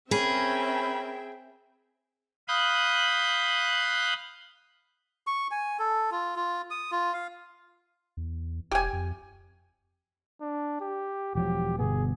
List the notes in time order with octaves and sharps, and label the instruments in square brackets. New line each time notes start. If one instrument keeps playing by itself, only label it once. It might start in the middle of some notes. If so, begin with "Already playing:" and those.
[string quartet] C4 E5 G5 [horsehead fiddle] C#4 A#4 [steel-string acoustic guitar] G#4 [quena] B5
[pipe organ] F5 B5 D#6 F#6 G6
[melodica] C#6
G#5
A4
F4
F4
D#6
F4
F5
[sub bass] E2
[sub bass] E1 [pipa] G4 G#5
[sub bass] F2
[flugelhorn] D4
G4
[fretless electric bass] E1 F3 F#3 [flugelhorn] G4
[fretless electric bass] G1 B2 B3 [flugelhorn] G#4